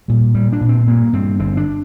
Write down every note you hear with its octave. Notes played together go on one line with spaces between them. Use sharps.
A#2 G3
A#2 G3
D4
A#2
C4
G2 A#3
G2 C4
G1 C4
D4